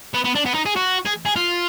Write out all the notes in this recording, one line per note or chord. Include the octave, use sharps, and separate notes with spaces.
B3
B3
D4
B3
D#4
G#4
F#4
G#4
G#4
F4